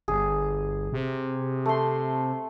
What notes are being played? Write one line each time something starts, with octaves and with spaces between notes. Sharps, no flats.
G1 G#4
C3
A3 C6